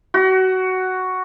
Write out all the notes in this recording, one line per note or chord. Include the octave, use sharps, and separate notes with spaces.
F#4